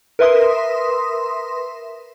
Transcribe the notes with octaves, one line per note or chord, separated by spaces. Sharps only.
A#4 B4 E5 C6 D#6